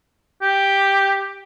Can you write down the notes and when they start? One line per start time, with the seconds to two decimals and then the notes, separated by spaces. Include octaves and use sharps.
0.41 G4